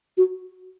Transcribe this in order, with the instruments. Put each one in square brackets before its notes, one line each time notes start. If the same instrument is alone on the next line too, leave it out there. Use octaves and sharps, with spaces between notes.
[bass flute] F#4